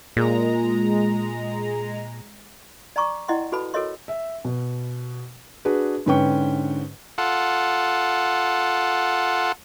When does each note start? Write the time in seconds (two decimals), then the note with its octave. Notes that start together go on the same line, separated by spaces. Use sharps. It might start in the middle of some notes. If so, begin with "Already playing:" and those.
0.17 A#2 G#3 A#5
2.96 D5 G#5 A#5 C#6 D6
3.28 E4 D5 D#5 F#5 G5 C6
3.52 F#4 A4 B4 A5 B5
3.74 F#4 A4 A#4 C#5 D#5 C6
4.08 E5
4.45 B2
5.65 D4 F#4 G#4 B4
6.06 G#2 D3 C#4 B4 G5 C#6
7.18 F4 A4 F#5